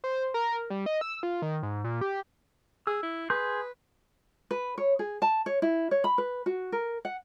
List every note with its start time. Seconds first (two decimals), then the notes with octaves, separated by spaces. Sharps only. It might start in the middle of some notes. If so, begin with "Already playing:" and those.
0.04 C5
0.34 A#4
0.70 G3
0.86 D#5
1.01 E6
1.23 F4
1.42 D#3
1.63 G#2
1.84 A#2
2.01 G4
2.87 G#4 E6
3.03 E4
3.30 G#4 B4 C6 G6
4.51 B4
4.78 C#5
4.99 G#4
5.22 A5
5.46 C#5
5.62 E4
5.91 C#5
6.04 B5
6.18 B4
6.46 F#4
6.72 A#4
7.05 F#5